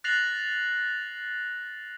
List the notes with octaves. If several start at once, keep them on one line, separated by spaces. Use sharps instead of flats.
F#6 A6 A#6 C7 F7 F#7